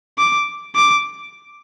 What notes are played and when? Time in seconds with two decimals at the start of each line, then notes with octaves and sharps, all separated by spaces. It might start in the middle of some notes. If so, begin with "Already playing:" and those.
0.18 D6
0.76 D6